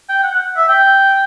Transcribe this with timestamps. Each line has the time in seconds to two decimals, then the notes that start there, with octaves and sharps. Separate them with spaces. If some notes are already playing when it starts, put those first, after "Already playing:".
0.09 G5
0.23 F#5
0.34 F#5
0.57 E5
0.68 G5